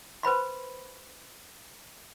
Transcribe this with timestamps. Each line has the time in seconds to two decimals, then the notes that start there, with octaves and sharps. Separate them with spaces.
0.23 B4 C5 B5 C6